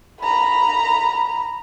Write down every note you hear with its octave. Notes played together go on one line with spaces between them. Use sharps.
A#5 B5